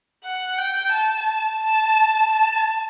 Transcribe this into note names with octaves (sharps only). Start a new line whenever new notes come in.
F#5
G5
A5
A5
A5